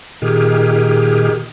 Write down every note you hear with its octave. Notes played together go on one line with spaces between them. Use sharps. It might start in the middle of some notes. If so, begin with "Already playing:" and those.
A#2 D#3 G4 G#4 F6